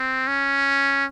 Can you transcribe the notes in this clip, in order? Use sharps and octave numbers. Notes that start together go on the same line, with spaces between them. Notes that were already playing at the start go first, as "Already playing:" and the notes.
Already playing: C4
C#4